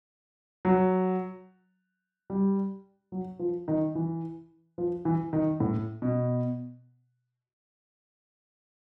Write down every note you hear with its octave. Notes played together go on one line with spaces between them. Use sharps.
F#3
G3
F#3
F3
D#3
E3
F3
E3
D#3
A2
B2